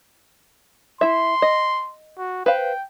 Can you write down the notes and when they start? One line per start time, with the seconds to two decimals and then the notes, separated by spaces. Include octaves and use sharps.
1.01 E4 E5 C6
1.42 D#5
2.18 F#4
2.46 B4 C5 F5 G5